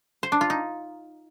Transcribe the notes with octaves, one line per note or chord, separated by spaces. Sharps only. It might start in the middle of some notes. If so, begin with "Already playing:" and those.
C5
D4
F4
D#4